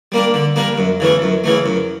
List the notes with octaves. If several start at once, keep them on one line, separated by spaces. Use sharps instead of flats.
G3 A#3 D4
D3
G3 A#3 D4
F#2
C#3 E3 A3
F#2
C#3 E3 A3
F#2